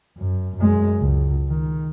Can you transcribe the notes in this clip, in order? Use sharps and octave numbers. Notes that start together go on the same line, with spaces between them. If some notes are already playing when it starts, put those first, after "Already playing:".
F#2
F#2 G#3
C#2
D#3